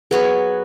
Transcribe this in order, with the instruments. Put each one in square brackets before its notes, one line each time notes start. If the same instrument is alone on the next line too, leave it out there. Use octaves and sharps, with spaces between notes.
[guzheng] F#3 B3 F#4 C#5 [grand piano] G#4 B4